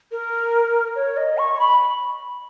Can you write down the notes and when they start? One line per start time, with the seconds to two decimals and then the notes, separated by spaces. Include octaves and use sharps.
0.12 A#4
0.96 C#5
1.17 D#5
1.38 C#6
1.54 C#6
1.59 B5